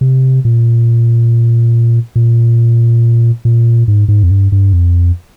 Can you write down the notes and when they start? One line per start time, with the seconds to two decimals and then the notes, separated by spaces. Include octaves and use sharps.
0.01 C3
0.45 A#2
2.16 A#2
3.45 A#2
3.88 G#2
4.08 G#2
4.23 F2
4.31 G2
4.52 G2
4.73 F2